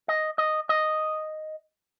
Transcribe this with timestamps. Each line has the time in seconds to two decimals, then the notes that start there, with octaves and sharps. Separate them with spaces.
0.08 D#5
0.38 D#5
0.69 D#5